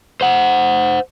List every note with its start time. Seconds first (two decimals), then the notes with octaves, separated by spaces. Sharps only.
0.21 C5 F#5